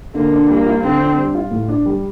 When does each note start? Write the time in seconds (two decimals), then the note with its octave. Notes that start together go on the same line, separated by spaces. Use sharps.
0.14 D3 A#3
0.32 D4
0.49 G3 A#3
0.66 F4
0.83 D3 C4
1.00 D4
1.18 G3
1.35 F4
1.51 A2
1.68 D4
1.86 G3